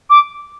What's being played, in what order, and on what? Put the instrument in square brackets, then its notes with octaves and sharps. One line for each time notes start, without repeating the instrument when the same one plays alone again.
[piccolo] D6